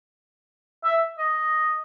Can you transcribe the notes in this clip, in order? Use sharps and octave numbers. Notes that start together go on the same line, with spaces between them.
E5
D#5